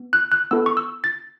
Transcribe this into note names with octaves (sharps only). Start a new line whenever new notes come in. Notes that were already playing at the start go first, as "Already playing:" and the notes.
Already playing: B3
F#6
F#6
B3 E4 A4 E6
C#6
E6
A6